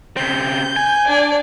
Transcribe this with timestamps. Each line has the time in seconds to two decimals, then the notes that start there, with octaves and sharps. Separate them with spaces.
0.17 C#3 C4 G6
0.76 G#5
1.06 D4 D5